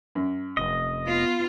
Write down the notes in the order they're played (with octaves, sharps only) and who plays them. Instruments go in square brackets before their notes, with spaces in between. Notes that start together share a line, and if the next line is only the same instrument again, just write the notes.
[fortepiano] F#2
[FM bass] F1 [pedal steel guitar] D#5
[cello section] B3 F4